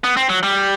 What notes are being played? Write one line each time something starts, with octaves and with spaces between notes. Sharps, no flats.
B3
C4
F#3
G3